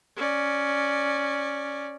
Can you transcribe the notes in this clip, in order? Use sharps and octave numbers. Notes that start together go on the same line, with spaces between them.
C#4 D5